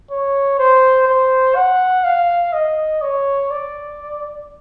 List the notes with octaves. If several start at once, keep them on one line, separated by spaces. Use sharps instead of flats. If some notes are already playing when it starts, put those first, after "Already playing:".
C#5
C5
C5
F#5
F5
D#5
C#5
D5